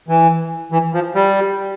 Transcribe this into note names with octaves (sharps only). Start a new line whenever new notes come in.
E3
E3
F3
G3